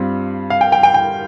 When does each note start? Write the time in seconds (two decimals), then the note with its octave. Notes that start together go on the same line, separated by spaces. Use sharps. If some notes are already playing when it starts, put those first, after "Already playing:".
Already playing: G2 G3 C4 F4
0.50 F5
0.61 G5
0.72 G5
0.83 G5
0.94 G5